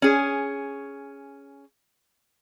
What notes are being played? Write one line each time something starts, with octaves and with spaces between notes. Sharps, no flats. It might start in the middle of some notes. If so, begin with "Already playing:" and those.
C#4 G#4